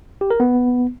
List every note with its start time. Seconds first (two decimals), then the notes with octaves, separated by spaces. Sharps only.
0.21 G4
0.30 A#4
0.40 B3